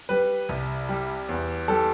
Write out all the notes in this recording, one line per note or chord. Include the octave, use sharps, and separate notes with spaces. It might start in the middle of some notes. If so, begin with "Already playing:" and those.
G3 B4
C2
G3
E2
G3 A4